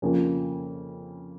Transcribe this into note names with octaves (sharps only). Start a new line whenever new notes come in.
F2 C#3 F3 A#3 C#4